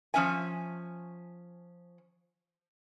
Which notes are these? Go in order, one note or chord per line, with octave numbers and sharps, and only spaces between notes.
F3 G#3 C#4 E5 G#5